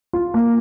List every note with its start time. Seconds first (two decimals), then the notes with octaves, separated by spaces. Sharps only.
0.13 F4
0.34 A#3